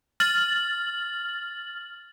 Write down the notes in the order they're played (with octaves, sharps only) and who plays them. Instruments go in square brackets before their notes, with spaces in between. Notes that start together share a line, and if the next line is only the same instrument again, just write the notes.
[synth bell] F6 A6 F#7